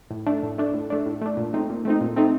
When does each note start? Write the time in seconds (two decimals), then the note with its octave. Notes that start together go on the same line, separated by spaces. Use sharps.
0.11 A2
0.26 A3 D4
0.43 A2
0.58 A3 D4
0.74 A2
0.90 A3 D4
1.06 A2
1.21 A3 D4
1.37 A#2
1.53 A3 C4 D#4
1.70 A#2
1.85 A3 C4 D#4
2.01 A#2
2.16 A3 C4 D#4